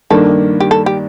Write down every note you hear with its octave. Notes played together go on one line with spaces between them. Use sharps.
G2 D#3 A#3 D4 A4
G4
A4
G4